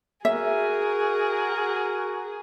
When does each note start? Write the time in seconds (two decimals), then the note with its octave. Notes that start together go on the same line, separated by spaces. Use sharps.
0.25 F#4 G#4 A#4 E5